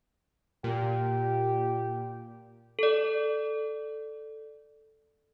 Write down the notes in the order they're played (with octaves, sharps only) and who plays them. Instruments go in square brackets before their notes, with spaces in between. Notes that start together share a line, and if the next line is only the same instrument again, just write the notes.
[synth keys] A#2 [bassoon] G4
[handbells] A4 D5